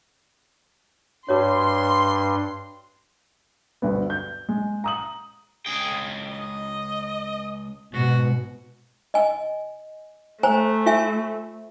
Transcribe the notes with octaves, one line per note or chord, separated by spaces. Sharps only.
G2 F#4 C#5 C6
D2 G2 B3
G6
G#3
A#5 D#6 F#7
C#2 G#4 G5
D#5
G#2 B2 F#4
D#5 G#5
A3 C5 G#5 A#5
F4 E5 G#5